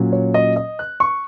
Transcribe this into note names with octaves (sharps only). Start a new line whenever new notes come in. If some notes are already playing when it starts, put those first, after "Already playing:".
Already playing: A#2 F#3 C#4
C#5
D#5
D#5
F#6
C#6